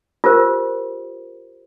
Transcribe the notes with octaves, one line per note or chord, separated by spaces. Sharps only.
F4 G4 A#4 C5